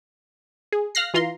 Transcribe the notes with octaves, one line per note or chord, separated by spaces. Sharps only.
G#4
F5 F6 F#6 A#6 C7
E3 F4 A#5 C6